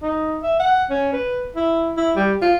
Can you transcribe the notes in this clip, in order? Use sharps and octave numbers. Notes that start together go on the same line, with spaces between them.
D#4
E5
F#5
C#4
B4
E4
E4
G3
F4